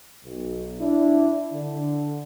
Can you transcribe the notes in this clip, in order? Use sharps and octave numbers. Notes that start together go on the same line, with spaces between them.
B1
D4 E4
D3